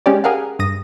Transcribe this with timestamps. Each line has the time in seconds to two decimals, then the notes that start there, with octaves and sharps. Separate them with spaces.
0.06 G#3 C#4 G4 D5
0.24 G4 G#4 A#4 F5 F#5
0.59 G2 D#6 A#6